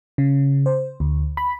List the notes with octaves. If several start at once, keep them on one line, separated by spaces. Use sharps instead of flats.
C#3
C5
D2
B5